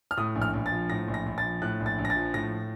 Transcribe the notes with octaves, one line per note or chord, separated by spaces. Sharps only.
F6
A2 D#6
A#1
F6
A#1
A6
F3
A2 A#6
A#1
A#6
A#1
A6
F3
A2 F#6
A#1
A6
A#1
A#6
A6
F3
A2 A#6